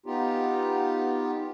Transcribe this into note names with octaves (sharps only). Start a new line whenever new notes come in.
B3 D#4 F4 G4